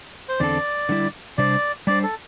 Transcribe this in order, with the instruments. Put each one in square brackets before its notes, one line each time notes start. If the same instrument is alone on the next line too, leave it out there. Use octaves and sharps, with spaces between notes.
[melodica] C5
[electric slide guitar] E2 D3 C4 E4 A4 [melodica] D5
[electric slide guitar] D3 G3 E4
[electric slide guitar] C3 G3 D4 C5 [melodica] D5
[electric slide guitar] G3 D4 C5 [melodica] D5
[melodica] A4